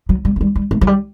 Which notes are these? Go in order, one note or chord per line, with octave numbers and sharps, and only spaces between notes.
F#3
G3
A3
G3
G3
A3
F#3
G3